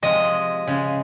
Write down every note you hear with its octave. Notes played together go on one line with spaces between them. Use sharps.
C3 F3 G#3 D#5
C#3 G#3